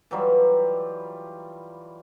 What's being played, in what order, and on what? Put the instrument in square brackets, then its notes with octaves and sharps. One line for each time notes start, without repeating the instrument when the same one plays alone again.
[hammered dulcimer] E3 F#3 G3 F4